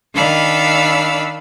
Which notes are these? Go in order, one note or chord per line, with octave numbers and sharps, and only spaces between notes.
D#3 D4 F5 B5 E6